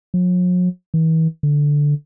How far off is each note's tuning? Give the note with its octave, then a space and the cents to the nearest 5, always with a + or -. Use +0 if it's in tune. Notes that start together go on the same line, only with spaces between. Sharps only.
F#3 -45
E3 -40
D3 -5